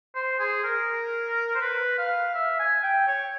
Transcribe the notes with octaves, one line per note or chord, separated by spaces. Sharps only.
C5
G#4
A#4
C5
B4
F5
E5
G#5
G5
C#5